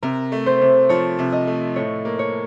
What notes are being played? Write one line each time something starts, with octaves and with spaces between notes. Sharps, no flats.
C3 A#4
A3
C5
C3
F3 C#5
C3
D#5
A3
A2 C#5
A#3
C#5